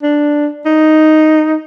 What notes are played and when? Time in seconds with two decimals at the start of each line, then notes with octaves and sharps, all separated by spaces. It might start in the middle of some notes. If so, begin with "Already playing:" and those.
0.03 D4
0.66 D#4